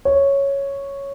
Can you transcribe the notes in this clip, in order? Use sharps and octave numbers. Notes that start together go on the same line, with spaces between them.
C#5